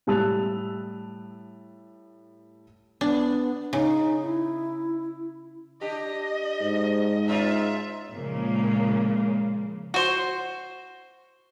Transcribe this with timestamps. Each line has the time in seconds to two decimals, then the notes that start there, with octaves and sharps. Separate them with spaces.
0.07 A2 G3 A5 E6 F#6 F7
3.01 B3 D4
3.73 C#3 D#4
4.23 E4
5.81 D4 G4 D#5
6.61 G#2
7.28 C#4 D#4 F4 E5
8.13 A#2 C#3 F3 G#3 A#3
9.94 F#4 C5